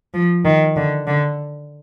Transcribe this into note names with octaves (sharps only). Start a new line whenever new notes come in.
F3
D#3
D3
D3